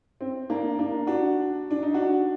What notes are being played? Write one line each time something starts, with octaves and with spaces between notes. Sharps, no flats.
C4
A#3 D4
A#3 D4
D4 F#4
D4
D#4
D4 F#4